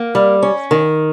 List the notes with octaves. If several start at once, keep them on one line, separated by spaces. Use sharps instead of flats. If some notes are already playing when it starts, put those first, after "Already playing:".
Already playing: A#3
G3
C#4
D#3